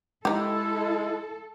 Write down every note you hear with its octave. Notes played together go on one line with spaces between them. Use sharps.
G#3 D#4 E4 G4 A4